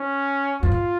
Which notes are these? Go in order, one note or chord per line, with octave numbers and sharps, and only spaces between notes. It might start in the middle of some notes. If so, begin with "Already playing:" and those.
Already playing: C#4
F#2 F4
G#2